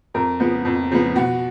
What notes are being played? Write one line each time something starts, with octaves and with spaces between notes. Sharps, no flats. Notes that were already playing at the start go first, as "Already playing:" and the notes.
F2 A#4
C#3 F3 B3
F2
C#3 F3 B3
B2 F#4